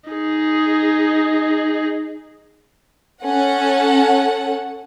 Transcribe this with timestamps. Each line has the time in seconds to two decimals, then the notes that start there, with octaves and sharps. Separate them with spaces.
0.10 D#4 G#4
3.24 C#4 A4 F#5